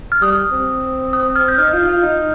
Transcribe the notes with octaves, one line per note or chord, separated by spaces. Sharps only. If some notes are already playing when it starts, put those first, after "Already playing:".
F6
G3 D#6
C4
D#6
F6
G6
D#4 F6
F4
F4
D#4